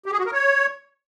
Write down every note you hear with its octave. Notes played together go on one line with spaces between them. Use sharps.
G4
G#4
F#4
A#4
C#5